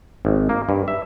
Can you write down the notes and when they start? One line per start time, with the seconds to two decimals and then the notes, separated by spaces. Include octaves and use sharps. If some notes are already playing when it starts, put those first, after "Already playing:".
0.25 G#1
0.49 A#3
0.69 G2
0.88 E5